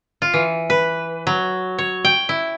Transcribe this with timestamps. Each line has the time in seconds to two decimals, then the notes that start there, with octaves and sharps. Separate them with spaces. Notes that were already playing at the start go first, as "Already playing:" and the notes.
0.22 F4
0.34 E3
0.70 B4
1.27 F#3
1.78 C#5
2.05 G5
2.29 E4